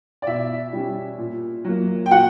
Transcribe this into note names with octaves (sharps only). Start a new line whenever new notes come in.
D5
B2 E4 E5
G3 C#4
A#2
F#3 A#3
G5
A#2 F#4 F#5